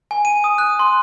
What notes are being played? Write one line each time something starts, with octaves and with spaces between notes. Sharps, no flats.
G#5
D#7
D#6
F#6
C6